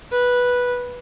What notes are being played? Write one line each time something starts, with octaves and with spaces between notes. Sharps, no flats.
B4